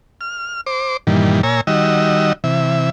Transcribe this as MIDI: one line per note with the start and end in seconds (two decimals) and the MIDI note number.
0.21 0.61 89
0.66 0.97 72
0.66 0.97 86
1.07 1.41 43
1.07 1.41 46
1.07 1.41 51
1.07 1.41 52
1.07 1.41 55
1.43 1.61 46
1.43 1.61 73
1.43 1.61 80
1.43 1.61 82
1.43 1.61 88
1.67 2.33 51
1.67 2.33 55
1.67 2.33 66
1.67 2.33 75
1.67 2.33 88
2.44 2.90 48
2.44 2.90 52
2.44 2.90 76